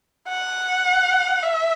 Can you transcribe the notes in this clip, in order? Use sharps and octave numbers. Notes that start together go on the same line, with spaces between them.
F#5
E5